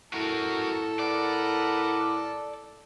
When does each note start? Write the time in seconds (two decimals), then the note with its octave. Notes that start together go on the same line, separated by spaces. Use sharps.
0.14 A2 F#4 A4 A#4
0.99 A#4 B4 D5 F#5